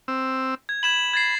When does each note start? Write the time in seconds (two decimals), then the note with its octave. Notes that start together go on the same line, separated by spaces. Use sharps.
0.08 C4 E6
0.69 G#6
0.83 B5 G#6 E7 F#7
1.14 G#6 A6 C7